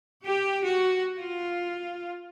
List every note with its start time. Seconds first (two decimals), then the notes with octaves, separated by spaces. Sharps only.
0.23 G4
0.64 F#4
1.20 F4